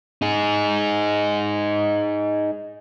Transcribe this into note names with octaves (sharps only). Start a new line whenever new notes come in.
D#4 G#4